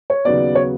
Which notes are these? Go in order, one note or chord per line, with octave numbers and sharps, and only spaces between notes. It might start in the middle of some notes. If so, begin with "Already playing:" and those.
C#5
D#2 C#3 F#3 B3 D5
C#5